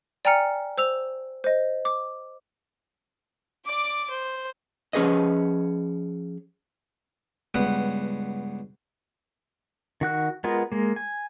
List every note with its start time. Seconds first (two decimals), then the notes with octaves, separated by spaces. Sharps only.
0.25 D5 G5 G#5 A#5 F6 C#7
0.78 C5 E6 F7
1.44 C5 D#5
1.85 D6
3.66 D5 D6
4.10 C5
4.93 F3 C#4 G#4 B4 D#5
7.54 C#2 G2 B3 F#5
10.01 D#3 F#4 F#6
10.44 G#3 B3 F4 A#4
10.72 G#3 A#3
10.96 G#5